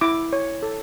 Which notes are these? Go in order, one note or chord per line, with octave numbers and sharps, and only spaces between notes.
E4 D6
C#5
A4